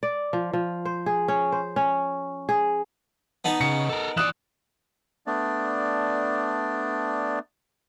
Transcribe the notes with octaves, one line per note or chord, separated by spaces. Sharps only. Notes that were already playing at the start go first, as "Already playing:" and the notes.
D5
F3
F3
C5
G#4
C#4
C5
C#4
G#4
B3 D#4 A5
C#3 C#7
A4 A#4
E3 D5 D#6 F#6 E7
A3 B3 D4 D5